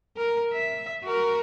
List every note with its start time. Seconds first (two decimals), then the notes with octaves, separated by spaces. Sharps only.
0.17 A#4
0.53 E5
1.04 F#4 A#4